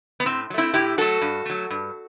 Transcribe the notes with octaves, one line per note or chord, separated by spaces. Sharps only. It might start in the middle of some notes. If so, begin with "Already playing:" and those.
B3
A2 C4
F#3
A3 C4 E4
A2 E4 G4
F#3 A3 F#4 A4
G2
F#3 A3
G2